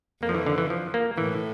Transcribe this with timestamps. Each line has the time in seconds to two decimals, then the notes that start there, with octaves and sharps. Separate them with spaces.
0.23 F2 A#3
0.29 F3
0.34 E3
0.47 D3
0.58 E3
0.70 F3
0.94 A#3
1.18 A2 E3